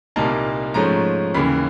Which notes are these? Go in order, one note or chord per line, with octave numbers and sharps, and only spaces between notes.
C2 A#2 G3 A#3 D#4 A5
G#2 F3 A3 C#4 A#5
D#2 C#3 E3 B5